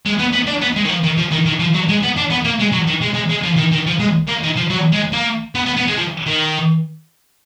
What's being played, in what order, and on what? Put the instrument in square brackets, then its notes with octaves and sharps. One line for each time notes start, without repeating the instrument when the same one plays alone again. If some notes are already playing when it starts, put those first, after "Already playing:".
[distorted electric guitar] G#3
B3
B3
D4
B3
G#3
D#3
F3
D#3
F3
D#3
D#3
F3
F#3
G#3
B3
D4
B3
A#3
G#3
F#3
D#3
G#3
G#3
G#3
F3
D#3
D#3
F3
G#3
A#3
D#3
F3
F#3
G#3
A#3
B3
B3
B3
G#3
F3
D#3